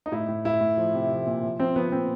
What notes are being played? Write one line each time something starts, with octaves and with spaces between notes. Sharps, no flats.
D#4
A2 E4
A2
A2 E4
A2
F3
C3
F3
A#2
F3
F3 C4
F3 B3
A#2 C4